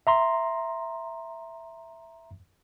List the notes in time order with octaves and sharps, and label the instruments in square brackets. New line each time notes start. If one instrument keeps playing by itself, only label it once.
[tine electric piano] E5 A#5 C6